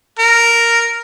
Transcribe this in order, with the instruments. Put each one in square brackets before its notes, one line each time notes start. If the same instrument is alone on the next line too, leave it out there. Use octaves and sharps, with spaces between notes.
[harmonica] A#4